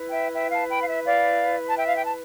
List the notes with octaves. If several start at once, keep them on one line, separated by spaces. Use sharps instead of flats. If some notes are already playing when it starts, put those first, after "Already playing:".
Already playing: E4 B4
E5 G5
E5 G5
F5 A5
G5 B5
F5
E5
D5 F5
A5
E5 G5
F5
G5
A5